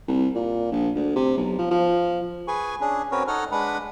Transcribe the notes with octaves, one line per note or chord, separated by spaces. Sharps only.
C2
A#2
A#1
D2
C3
B1
F3
F3
G#4 B4 G#5 C#6
C#4 D4 G#4
C4 C#4 F#4 A#4 B4 C#5
D#4 A4 C#5 F#5 F6
G#3 D4 B4 F#5 B5